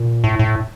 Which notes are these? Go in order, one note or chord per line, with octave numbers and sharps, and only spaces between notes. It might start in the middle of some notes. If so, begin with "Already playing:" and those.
Already playing: A#2
A2
A2